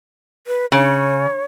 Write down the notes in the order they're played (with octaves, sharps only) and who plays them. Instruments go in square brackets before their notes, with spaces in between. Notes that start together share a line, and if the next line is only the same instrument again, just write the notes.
[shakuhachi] B4
[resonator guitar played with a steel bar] C#3 [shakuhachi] C#5